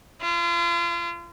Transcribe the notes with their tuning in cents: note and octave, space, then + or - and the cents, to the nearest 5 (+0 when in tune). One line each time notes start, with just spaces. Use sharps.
F4 -35